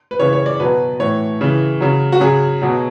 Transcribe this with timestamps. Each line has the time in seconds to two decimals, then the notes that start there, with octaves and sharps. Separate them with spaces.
0.11 B4
0.19 C#3 E3 C#5
0.33 C#5
0.46 D5
0.60 B2 F#3 B4
1.00 A2 E3 C#5
1.41 C#3 E3
1.81 C#3 F#3
2.12 F#4
2.20 C#3 F#3 G#4
2.62 B2 F#3